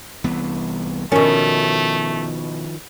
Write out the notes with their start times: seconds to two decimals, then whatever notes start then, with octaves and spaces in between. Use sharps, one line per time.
0.24 C2 E3 B3
1.12 B2 D#3 F3 A3 C#4 A#4